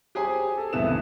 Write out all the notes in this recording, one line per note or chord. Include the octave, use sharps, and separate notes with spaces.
G4 G#4 C5 G#5
A4
C#2 G2 C3 E3 B3 E7